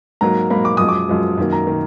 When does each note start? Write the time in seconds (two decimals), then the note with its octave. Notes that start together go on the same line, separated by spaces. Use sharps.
0.21 G#2 F#3 A#3 A#5
0.50 G#2 F#3 A#3 B5
0.65 D6
0.77 F#2 F3 G#3 D#6
0.88 D6
1.09 F#2 F3 G#3
1.38 F#2 D#3 A#3
1.53 A#5
1.67 D#3 A#3